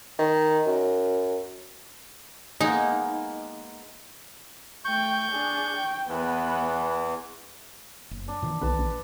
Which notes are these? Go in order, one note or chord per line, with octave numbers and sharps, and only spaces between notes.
D#3
F#2
G#3 A#3 B3 D#4
A3 G5 C#6 G6
D4 G#4
G5
E2 E3 B3 B4
F#1
D4
A#2 D#3 E3
B1 B4 A5
A#1